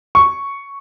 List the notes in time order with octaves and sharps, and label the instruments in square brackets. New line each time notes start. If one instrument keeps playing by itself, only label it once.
[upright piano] C#6